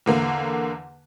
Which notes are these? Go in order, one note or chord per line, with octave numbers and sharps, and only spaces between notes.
E2 D3 A#3